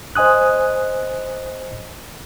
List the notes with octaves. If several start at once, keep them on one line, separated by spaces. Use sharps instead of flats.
C5 D#5 G#5 D#6 F#6